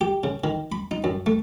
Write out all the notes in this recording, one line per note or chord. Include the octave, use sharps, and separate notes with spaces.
G4
C#3
D#3
B5
D#4
F#2
A3